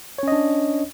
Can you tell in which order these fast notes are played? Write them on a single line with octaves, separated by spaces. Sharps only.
C#5 C#4 D#5 D4